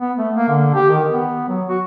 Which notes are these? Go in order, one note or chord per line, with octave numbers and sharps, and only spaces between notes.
B3
A3
A#3
D3
G4
D#3
B3
F#3
F#4